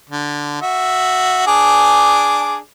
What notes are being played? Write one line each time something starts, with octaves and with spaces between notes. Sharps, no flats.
D3
F#4 E5
D4 G#4 D6